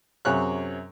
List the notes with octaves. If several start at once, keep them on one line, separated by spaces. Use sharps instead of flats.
F#2 C3 G#4 C#5 F#6